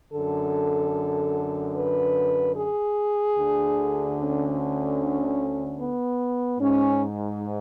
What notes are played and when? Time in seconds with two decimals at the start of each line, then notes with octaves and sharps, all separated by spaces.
0.13 F#2 D3 A4
1.75 B4
2.56 G#4
3.36 D2 D3
4.18 C#4
5.79 B3
6.60 G#2 C#4